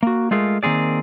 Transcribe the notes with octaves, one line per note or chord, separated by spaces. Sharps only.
A#3 F#4
G#3 A3 F4 G#4 A#4
D#3 A#3 C4 G#4 D5